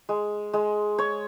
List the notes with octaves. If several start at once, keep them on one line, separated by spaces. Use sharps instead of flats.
G#3
G#3
C#5